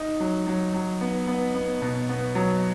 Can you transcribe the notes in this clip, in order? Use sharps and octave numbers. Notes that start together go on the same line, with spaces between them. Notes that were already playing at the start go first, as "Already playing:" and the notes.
Already playing: D#4
F#3
F#3
F#3
B3
B3
B3
B2
B3
F#3